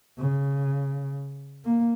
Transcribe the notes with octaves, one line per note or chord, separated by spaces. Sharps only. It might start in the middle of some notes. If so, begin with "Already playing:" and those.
C#3
A#3